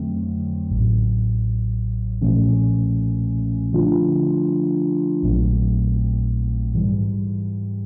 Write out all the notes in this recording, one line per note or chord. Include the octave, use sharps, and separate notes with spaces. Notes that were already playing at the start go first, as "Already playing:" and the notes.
Already playing: F2 D3 F#3 A3 C4
A1 A2 F#3
B1 A#2 F3 A3 C#4
D3 F3 A3 D4 F4
A#1 A#2 F#3 A3 C4
G#2 E3 G3